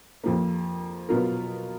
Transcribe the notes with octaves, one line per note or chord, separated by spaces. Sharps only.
F2 F3 A#3
B2 F#3 B3 F4 A#4